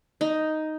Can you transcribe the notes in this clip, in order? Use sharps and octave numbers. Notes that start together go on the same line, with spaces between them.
D#4